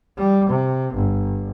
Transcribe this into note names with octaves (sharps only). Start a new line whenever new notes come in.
G3
C3
G1